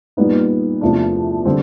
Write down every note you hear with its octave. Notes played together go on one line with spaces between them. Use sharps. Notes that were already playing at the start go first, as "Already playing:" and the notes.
A#2 G3 B3 D#4
E2 C3 F3 A3 D4
D3 G3 C4